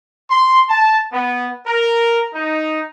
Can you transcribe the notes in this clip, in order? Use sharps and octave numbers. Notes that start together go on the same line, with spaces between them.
C6
A5
B3
A#4
D#4